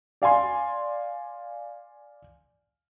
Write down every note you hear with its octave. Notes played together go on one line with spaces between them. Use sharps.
D5 F5 G#5 C6